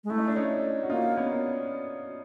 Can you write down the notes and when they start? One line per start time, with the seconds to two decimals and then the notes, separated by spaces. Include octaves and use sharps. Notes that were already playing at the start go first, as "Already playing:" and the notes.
0.04 G#3
0.10 A3 E4
0.18 D#4
0.28 D4
0.36 C#4 D#4
0.83 F#4
0.90 A#3 D#4 F4
1.16 B3 C#4